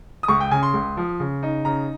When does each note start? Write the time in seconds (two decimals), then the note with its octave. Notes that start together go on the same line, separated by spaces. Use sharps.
0.23 D#6
0.28 C#2 C#6
0.40 G5
0.51 C#3 G#5
0.63 C6
0.73 C#2
0.97 F3
1.20 C#3
1.43 D#4
1.65 C#3 A#5